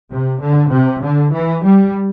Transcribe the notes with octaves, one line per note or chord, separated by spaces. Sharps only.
C3
D3
C3
D3
E3
G3